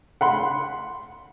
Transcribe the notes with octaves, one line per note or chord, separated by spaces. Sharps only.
F#5 B5 C6